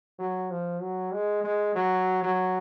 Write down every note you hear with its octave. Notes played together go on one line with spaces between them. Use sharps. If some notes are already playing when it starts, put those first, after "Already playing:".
F#3
F3
F#3
G#3
G#3
F#3
F#3